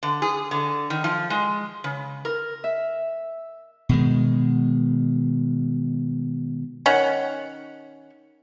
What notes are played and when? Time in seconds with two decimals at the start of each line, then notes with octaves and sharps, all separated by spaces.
0.03 D3
0.22 G#4
0.51 D3
0.90 D#3
1.04 F3
1.30 G#3
1.84 C#3
2.25 A#4
2.64 E5
3.89 B2 D#3 G#3
6.86 D#3 C#4 C#5 F#5